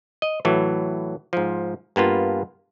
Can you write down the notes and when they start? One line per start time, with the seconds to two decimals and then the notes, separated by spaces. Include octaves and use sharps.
0.22 D#5
0.45 A2 E3 F#3
1.33 G#2 F3
1.96 G2 A#3 B3 F4